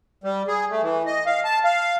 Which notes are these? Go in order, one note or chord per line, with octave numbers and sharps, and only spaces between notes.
G3
G#4
A3
E3
D#5
F5
A5
F5